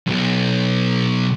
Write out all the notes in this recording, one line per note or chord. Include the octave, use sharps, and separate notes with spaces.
B1 F#2